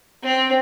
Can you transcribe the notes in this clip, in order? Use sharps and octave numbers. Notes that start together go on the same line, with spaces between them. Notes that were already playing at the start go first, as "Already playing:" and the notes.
C4